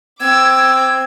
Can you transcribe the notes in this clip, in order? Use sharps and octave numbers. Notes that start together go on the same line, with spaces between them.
C4 D6 E6 G#6